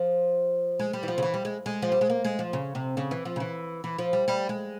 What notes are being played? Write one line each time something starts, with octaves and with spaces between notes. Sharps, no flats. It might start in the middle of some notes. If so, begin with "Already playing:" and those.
Already playing: F3
G#3
G3
E3
F3
C#3
E3
G3
G#3
G#3
F3
G3
G#3
A#3
G#3
F3
C#3
C3
C#3
E3
F3
C#3
E3
E3
F3
G3
G3
G#3